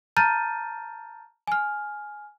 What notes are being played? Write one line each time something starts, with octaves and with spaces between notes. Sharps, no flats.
A5 A#5 F6 G6 A6 D#7
G#5 F6